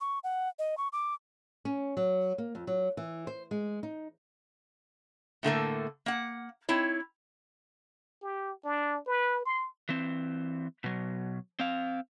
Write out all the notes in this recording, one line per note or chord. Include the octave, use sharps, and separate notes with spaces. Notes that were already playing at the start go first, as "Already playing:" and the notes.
C#6
F#5
D#5
C#6
D6
C#4
F#3
A#3
F2
F#3
E3
C5
G#3
D#4
A2 D3 A3 A#3
A#3 F#5
C4 D#4 E4 C#5
G4
D4
B4
C6
E3 C4
B2 F#3
C4 F5